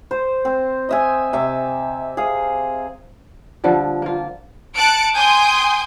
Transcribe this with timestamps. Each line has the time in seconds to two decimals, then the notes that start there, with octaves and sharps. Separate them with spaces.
0.11 C5
0.45 C4
0.89 D#5 E5 G#5
1.33 C3 E5
2.17 G#4 F5
3.64 D3 F3 G3
4.02 A#3 F4
4.74 A5 F#6 C#7 D7
5.15 G5 G#5 C6 D#6 G6